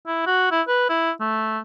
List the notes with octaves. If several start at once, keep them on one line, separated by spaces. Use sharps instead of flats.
E4
F#4
E4
B4
E4
A3